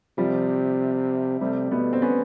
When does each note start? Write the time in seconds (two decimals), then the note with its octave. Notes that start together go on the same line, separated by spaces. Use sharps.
0.18 C3 F3 G3
1.41 C3 G3 A3
1.71 B2 A3 B3
1.93 C4
2.02 B3 C#4